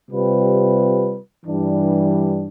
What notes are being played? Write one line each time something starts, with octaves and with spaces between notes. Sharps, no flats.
C3 G3 C4 F4 B4
G2 E3 G3 D4